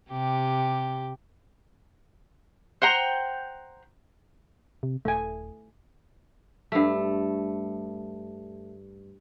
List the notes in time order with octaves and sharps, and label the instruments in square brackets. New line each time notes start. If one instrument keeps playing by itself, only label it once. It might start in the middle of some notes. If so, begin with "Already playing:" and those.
[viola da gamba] C3 [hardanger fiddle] G4
[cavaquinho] C5 F#5 G5 A#5
[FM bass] C3
[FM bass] D#1 [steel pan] A3 G#5
[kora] G2 A3